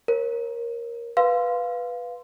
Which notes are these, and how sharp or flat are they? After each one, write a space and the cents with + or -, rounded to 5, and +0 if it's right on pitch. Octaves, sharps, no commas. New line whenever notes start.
A#4 +10 C#5 -35
B4 +0 F5 +0 C6 -15